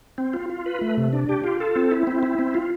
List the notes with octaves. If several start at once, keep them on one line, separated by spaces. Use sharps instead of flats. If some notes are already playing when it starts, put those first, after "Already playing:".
C4
F4
F4
B4
A3
C3
D4
G4
F4
A4
C4
E4
C4
E4
C4
F4